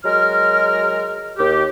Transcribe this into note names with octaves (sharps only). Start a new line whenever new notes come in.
F#3 G#3 A#4 F6
D#2 G4